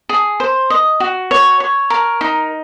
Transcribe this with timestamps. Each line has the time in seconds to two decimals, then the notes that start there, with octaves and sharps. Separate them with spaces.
0.09 G#4
0.40 C5
0.70 D#5
1.00 F#4
1.31 C#5
1.60 C#5
1.90 A#4
2.21 D#4